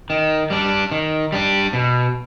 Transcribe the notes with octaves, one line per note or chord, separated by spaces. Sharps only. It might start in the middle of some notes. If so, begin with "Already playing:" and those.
D#3
G3 D4
D#3
G3 D4
B2